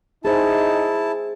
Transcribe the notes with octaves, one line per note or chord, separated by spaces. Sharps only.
D#4 E4 G#4 C5 A5